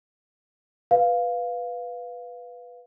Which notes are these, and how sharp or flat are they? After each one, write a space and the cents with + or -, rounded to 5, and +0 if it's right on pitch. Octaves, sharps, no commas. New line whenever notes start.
B4 +0 F5 +0